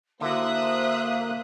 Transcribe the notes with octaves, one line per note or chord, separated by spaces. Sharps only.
D3 A#3 E4 F#4 C5 E5 D#6 F#6